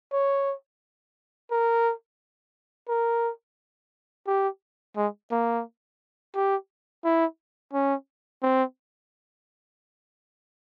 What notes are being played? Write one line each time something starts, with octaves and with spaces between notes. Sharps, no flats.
C#5
A#4
A#4
G4
G#3
A#3
G4
E4
C#4
C4